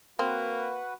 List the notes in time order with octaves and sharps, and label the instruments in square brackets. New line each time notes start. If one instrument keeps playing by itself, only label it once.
[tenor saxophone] A#3 [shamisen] C4 [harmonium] F#4 B4